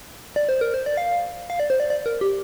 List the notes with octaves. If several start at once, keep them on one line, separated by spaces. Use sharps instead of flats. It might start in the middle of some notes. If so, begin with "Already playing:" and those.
D5
C5
A#4
C5
D5
F5
F5
D5
C5
D5
D5
A#4
G4